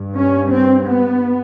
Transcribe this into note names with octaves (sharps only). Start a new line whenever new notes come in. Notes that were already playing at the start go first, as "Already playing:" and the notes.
Already playing: G2
C#4
C4
B3